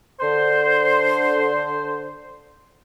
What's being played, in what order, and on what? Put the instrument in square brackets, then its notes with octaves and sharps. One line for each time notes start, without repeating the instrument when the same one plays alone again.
[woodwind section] D3 C5